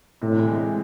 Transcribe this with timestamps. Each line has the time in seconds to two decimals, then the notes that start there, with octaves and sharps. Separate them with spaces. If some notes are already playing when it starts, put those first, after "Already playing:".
0.22 A2 C3
0.31 D3
0.39 E3
0.48 G#3